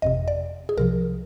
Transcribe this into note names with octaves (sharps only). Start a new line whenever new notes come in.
G1 F2 C3 D#5
D5
G#4
C2 C3 F3 A#4